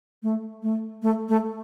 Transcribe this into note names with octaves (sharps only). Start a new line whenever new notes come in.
A3
A3
A3
A3